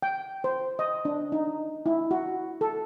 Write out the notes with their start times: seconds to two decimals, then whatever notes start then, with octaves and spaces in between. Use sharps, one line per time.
0.02 G5
0.44 C5
0.79 D#5
1.05 D4
1.32 D#4
1.86 E4
2.11 F#4
2.61 A4